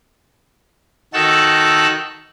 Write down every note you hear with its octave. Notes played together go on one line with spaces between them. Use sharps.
D#3 D#4 F#4 A4 E6 F#6